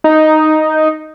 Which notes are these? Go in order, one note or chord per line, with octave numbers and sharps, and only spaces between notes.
D#4